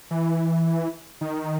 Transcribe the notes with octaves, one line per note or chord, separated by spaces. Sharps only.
E3
D#3